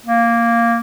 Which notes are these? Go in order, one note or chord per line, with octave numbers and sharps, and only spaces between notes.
A#3